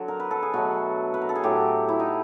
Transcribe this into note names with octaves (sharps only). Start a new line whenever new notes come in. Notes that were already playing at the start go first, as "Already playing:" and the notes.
Already playing: D3 F#3
A#4
B4
A4
G#4
B2 F#3 A3 F#4
B4
A#4
A4
G#4
A2 F#3 A3 G4
E4
D#4